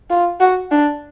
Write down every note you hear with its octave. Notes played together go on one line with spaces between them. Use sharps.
F4
F#4
D4